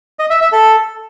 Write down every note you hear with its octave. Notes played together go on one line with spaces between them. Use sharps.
D#5
E5
E5
A4